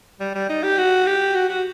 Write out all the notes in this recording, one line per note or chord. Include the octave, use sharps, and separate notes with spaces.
G3
G3
D#4
G4
F#4
G4
F#4
F#4